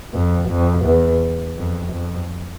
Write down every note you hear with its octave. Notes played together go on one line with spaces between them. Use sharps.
F2
F2
E2
F2
F2